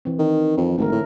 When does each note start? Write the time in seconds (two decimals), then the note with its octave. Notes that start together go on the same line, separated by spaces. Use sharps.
0.05 E3 C4
0.19 D#3
0.58 F2
0.78 G#1 D3 A3 A#4
0.92 A2